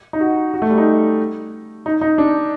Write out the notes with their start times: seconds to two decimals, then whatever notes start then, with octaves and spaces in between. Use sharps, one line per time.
0.13 D#4
0.20 F#4
0.54 F#4
0.62 A3
0.70 G3
0.78 D#4
1.86 D#4
2.01 D#4
2.18 D4